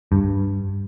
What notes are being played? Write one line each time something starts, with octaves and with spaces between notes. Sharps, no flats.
G2